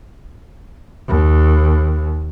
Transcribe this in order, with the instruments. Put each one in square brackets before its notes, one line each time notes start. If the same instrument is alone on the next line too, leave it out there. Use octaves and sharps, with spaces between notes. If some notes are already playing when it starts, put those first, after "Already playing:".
[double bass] D#2